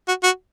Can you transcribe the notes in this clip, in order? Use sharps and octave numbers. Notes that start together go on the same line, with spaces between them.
F#4
F#4